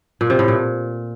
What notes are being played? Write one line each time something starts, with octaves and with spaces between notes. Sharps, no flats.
A#2
C3
A2
A#2